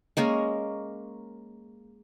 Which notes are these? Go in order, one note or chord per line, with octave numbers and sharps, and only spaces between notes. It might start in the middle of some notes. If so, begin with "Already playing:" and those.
G#3 A#3 C#4 A#4